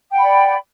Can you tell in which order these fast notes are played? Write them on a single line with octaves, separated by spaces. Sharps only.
G5 F#5 B5 D5